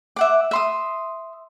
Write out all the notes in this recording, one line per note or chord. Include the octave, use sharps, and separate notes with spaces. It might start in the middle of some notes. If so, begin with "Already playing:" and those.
E5 F#5 D6
E5 C6 D#6